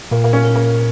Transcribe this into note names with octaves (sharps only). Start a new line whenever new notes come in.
A#2 A#3
A#3
C#4
A#4
A#3